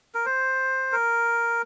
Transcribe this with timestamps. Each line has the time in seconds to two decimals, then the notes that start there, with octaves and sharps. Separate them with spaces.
0.15 A#4
0.26 C5
0.92 A#4